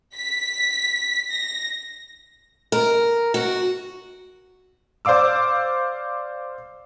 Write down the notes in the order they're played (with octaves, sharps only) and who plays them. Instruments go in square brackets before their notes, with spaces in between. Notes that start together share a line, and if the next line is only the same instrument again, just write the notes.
[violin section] B6
A#6
[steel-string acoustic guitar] A#4
F#4
[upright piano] C5 D5 F5 D6 E6